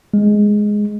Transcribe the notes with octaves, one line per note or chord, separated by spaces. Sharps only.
G#3